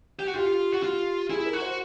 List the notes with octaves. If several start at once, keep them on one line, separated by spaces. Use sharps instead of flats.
G4
F#4
F4 G4
F#4
F4
E4 G#4
A#4
F#4
C5